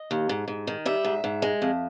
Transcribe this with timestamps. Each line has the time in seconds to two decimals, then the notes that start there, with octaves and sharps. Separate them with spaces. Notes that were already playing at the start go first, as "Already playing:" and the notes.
Already playing: D#5
0.11 D#2
0.29 G#2
0.48 G#2
0.67 D#3
0.86 G3 E5
1.05 G#2
1.24 G#2
1.42 G#3
1.62 F2